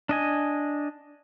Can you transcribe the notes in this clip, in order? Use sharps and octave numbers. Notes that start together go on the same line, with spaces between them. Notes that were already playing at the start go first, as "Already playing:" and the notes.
D4 D#5 G#5